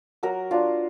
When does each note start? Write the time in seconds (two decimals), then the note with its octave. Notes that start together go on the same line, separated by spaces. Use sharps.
0.23 F#3 F#4 A#4
0.51 D4 F4